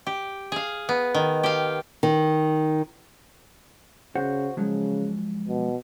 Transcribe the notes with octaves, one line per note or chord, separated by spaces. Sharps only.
G4
G#4 F5
B3
D#3
G4 F5
D#3
C#3 F#4 C5 F#5
C#3 F3 F#3 G#3
B2